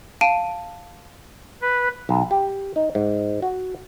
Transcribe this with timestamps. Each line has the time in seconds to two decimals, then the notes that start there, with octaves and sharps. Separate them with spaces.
0.21 F5 A5 D7 D#7
1.62 B4
2.09 B1
2.31 G4
2.76 D#4
2.95 G#2
3.42 F#4